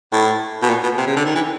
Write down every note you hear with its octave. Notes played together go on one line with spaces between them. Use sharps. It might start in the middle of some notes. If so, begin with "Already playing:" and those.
A2
B2
A#2
B2
C3
C#3
D3
D#3
E3